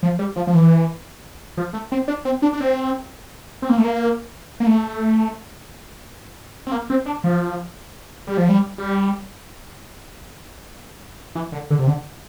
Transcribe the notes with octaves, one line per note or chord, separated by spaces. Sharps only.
F3
G3
F3
F3
E3
F3
A3
C4
D4
C4
D4
D4
C4
C4
A#3
A3
A#3
A#3
A3
C4
A#3
C4
D4
F3
G3
F3
G3
G3
E3
D3
D3
C3
D3